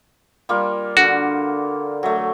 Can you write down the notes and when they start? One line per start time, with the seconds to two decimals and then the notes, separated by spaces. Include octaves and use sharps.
0.49 G3 A#3 F4
0.97 D3 F#4
2.03 F#3 A3